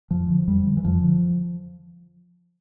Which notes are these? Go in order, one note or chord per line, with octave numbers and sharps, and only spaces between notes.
F2 F3
D3
F2 G3
D3
E3
F2 F3
D3